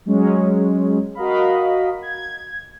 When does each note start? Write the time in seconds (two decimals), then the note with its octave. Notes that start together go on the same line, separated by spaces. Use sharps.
0.06 F#3 G#3 C#4
1.15 F#4 A#4 D#5 F5 B5
2.02 G#6